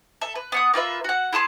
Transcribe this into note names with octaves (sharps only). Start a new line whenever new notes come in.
A4 E5
B4
B3 F#5 D#6
A#3 F4 B4 E5
F#4 F#5
E4 G#4 A5 C6